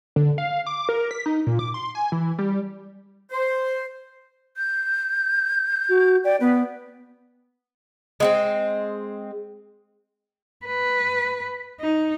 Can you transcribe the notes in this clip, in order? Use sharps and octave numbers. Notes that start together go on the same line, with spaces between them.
D3
F5
D6
A#4
B6
D#4
A#2
D6
C6
G#5
E3
G3
C5
G6
F#4
D5 G5
B3 B4
G#3 B3 C4
B4
D#4